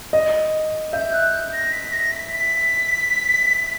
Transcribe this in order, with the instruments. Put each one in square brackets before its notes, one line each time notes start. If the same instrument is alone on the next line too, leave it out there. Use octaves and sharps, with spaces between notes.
[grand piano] D#5
[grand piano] E5 [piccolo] G6
[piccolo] F#6
G6
A#6
B6
A#6
B6
B6